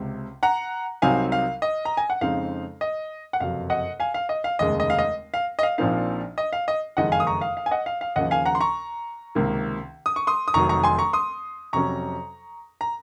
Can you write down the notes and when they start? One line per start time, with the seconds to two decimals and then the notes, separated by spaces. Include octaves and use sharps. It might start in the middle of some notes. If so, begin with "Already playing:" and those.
Already playing: C#2 C3
0.43 F#5 A#5
1.02 C2 C3 F#3 C4 D#4 F5 G#5
1.32 F5
1.62 D#5
1.85 A#5
1.97 G#5
2.10 F#5
2.21 F2 C#3 G#3 C4 D#4 F5
2.81 D#5
3.33 F#5
3.40 F#1 F2 C3 F#3 F5
3.70 D#5 F#5
4.00 F5 G#5
4.14 F5
4.29 D#5
4.44 F5
4.59 F1 D#2 C#3 G#3 D#5
4.80 D#5
4.90 F5
4.99 D#5
5.34 F5
5.59 D#5
5.63 F5
5.78 A#1 A#2 F3 C4 D#4 F5
6.38 D#5
6.53 F5
6.68 D#5
6.97 F#1 F2 D#3 G#3 D#4 D#5 F#5
7.12 F5 G#5
7.20 D#6
7.27 A#5 C#6
7.41 F5
7.57 F5
7.66 G#5
7.71 D#5 F#5
7.86 F5
8.01 F5
8.16 D#2 C#3 F3 D#5 F#5
8.31 F5 G#5
8.45 F#5 A#5
8.55 C6
8.60 A#5 C#6
9.35 C#2 C3 D#3 A#3
10.06 D#6
10.16 C#6
10.27 C6 D#6
10.48 D#6
10.54 F1 F2 D#3 F#3 A#5 C#6
10.69 A#5 C#6
10.84 G#5 C6
10.99 A#5 C#6
11.13 C6 D#6
11.73 F2 C3 F#3 C#4 A#5 C#6
12.81 A#5